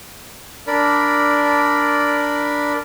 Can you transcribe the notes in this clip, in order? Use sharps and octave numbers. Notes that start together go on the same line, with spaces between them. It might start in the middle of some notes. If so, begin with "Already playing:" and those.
D4 A#4 D5 B5